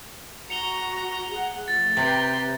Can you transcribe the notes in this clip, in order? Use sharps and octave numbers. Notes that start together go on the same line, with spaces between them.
F#4 A#5 C#7 F7 G7
G#4 F#5
F3 A3 A6
C3 G4 B4 G5 A#5 C6